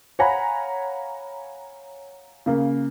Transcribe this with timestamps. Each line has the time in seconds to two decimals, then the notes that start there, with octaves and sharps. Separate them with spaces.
0.19 C#5 F5 F#5 G#5 A#5 B5
2.46 C#3 A#3